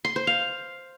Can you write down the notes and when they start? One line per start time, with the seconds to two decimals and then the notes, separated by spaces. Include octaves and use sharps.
0.05 C6
0.16 C5
0.27 F5